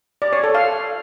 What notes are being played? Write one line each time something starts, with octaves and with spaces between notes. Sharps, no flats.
D5
C#5
A4
F5